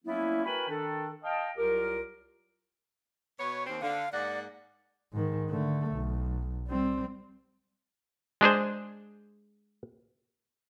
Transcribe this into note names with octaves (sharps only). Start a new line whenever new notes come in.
F#3 G3 A#3 B3 C#4 E4
F#4 A#4 B4 G5 G#5 B5
D#3 D4 A4
D#5 F5 G5 A5
C2 F#3 F4 G4 A#4
B2 B3 C#5
D#2 C4
D3 F5
G#2 A#3 D5 F#5
G#2 D#3
D3 A3
B1
G3 C4
G#3 D4 G#4 C5